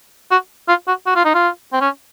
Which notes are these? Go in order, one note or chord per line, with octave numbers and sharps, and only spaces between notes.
F#4
F4
F#4
F#4
F4
D#4
F4
C4
C#4